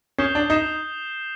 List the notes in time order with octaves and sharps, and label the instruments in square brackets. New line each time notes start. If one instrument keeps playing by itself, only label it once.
[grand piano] C#4 [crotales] D#6 G6 C7 E7 G7
[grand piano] D4
[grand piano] D#4 [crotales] D#6 G6 C7 E7 G7